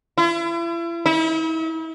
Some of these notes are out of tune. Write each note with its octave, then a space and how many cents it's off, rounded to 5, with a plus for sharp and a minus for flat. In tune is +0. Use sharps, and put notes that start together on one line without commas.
E4 +40
E4 -40